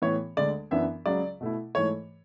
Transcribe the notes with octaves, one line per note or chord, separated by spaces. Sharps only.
A2 E3 B3 C#5
D2 D3 G#3 D5
F#2 E3 B3 D4 E5
C#2 C#3 F#3 D5
B2 A3 E4
G#2 E3 A3 C#5